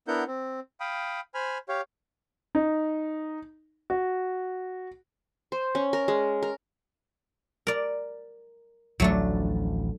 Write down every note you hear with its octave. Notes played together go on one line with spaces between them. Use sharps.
B3 D4 E4 A#4 F#5 G6
C4
F5 G5 B5 D#6
C5 G#5 B5 F6
G4 C#5 F5
D#4
F#4
C5
C#4
A#4
G#3
A#4
A#4 D5
A1 D2 F3 F#3 A3 D4